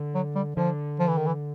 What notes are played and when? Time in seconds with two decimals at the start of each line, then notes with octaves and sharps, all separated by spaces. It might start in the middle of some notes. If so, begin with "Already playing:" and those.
Already playing: D3
0.14 F#3
0.35 G3
0.56 D3 F3
0.99 F3
1.08 E3
1.17 D#3
1.26 E3